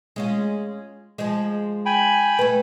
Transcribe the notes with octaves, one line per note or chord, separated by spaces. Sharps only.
G#3 C#4 F4
F3 G#3
G5 G#5 B5
A3 B4